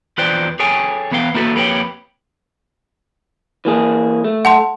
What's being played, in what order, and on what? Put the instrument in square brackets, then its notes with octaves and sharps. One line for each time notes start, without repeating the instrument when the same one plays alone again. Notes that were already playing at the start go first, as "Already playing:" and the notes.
[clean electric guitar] E2 F4 B4 C5 D5 G5
G#4 A4 C#5 G5 G#5
E2 B3 B4 F5 G5
A#3 E4 F#4 A4 B4
F2 A#3 G4 B4 C#5 G5
E3 A#3 G#4
A3
[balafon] F#5 A5 C6